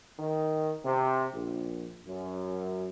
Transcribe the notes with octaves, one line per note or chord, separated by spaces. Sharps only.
D#3
C3
A#1
F#2